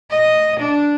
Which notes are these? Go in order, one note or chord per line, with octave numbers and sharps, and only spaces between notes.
D#5
D4